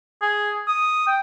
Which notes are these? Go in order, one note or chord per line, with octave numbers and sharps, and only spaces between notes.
G#4
D#6
G5